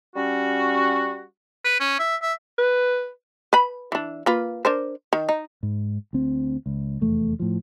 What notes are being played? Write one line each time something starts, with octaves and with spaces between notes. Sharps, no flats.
G3 C#4 F#4
B4
C#4
E5
E5
B4
B4 B5
E3 D4
A#3 F4 B4
D4 A#4 C5
D#3
D#4
G#2
D2 C4
C#2
F1 E2 A3
A2 F3